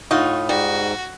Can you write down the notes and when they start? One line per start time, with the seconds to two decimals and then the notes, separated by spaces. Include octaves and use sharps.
0.11 A2 D#4 F4 F#4
0.49 G#2 G3 F#4